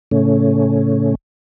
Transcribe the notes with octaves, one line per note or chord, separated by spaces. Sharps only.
A2 C#3 A3 C#4